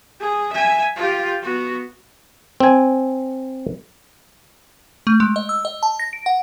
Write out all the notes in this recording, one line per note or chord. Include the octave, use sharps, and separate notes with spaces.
G#4
E5 G#5
F4 G4
B3 F#4
C4 G#5
A3
G#3
D#5
E6
D#5
A5
A#6
D7
F#5